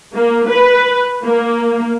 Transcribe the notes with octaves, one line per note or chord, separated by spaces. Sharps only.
A#3
B4
A#3